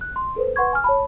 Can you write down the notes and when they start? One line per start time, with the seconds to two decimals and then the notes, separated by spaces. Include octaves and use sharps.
0.01 F#6
0.16 C6
0.36 A4 B4 C5
0.56 B4 F#5 C6 C#6 G#6
0.73 G#5 F6
0.84 C#5 A5 B5